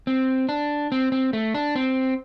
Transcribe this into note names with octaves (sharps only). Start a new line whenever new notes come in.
C4
D4
C4
C4
A3
D4
C4